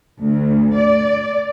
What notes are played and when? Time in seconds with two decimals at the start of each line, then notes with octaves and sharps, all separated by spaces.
0.19 D2
0.75 D5